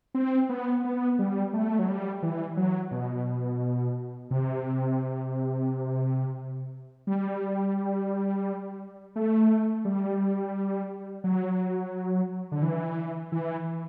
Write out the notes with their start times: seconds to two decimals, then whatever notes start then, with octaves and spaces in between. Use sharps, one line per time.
0.15 C4
0.49 B3
0.84 B3
1.19 G3
1.53 A3
1.79 F#3
1.88 G3
2.23 E3
2.57 F#3
2.91 B2
4.31 C3
7.07 G3
9.16 A3
9.85 G3
11.24 F#3
12.52 D3
12.63 E3
13.32 E3